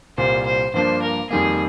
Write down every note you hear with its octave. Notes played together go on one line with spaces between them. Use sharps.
C2 A#2 G3 C5
C5
G2 F3 A#3 D4 C5
A#4
F2 D#3 G3 A#3 G#4